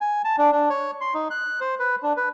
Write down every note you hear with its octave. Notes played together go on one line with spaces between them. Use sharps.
G#5
A5
D4
D4
C#5
C6
D#4
F#6
C5
B4
D4
B4